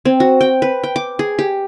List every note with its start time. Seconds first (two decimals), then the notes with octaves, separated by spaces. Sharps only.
0.05 C4
0.20 F#4
0.41 G5
0.62 B4
0.84 G5
0.96 D6
1.19 G#4
1.39 G4